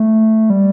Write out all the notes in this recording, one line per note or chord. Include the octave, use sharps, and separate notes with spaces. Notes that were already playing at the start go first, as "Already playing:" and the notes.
Already playing: A3
G3